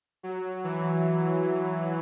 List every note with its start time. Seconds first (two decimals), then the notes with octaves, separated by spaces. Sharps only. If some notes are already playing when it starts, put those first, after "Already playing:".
0.23 F#3
0.64 E3